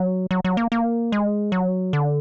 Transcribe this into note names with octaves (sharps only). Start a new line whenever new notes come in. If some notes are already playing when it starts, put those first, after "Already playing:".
Already playing: F#3
F#3
F#3
A#3
A#3
G#3
F#3
D3